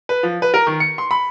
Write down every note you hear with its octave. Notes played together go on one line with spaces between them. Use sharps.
B4
F3
B4
A#4
D#3
C#7
C6
B5